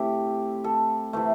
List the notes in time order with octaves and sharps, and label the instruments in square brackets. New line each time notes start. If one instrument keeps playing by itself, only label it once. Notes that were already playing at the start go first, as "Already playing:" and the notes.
Already playing: [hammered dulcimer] C3 A3 C4 E4 G4
A4
C3 E3 A3